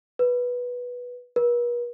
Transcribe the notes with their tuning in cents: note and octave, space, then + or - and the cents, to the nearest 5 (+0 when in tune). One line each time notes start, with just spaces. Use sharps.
B4 -10
B4 -45